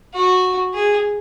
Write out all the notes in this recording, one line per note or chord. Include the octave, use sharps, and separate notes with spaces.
F#4
G#4